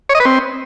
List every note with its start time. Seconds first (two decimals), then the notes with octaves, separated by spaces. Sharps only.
0.09 C#5
0.15 D#5
0.20 B4
0.25 C4